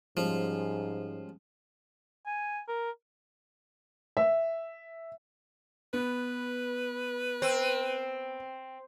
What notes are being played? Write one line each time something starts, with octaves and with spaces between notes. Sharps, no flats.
G#2 F3 G3 G#3 C#4
G#5
A#4
E5
B3 B4
C4